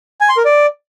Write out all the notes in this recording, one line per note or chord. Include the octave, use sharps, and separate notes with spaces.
G#5
C6
A#4
D5